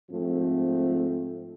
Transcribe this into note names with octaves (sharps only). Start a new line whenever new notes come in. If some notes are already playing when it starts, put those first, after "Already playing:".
G#2 F3 A3 C4